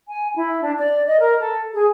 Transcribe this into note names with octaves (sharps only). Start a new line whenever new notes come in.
G#5
E4
D4
D5
D#5
A#4
A4
G#4